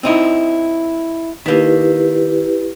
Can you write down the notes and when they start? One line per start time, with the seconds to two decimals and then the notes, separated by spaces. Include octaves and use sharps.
0.03 C4 D#4 E4
1.46 D#3 A#3 E4 G4 B4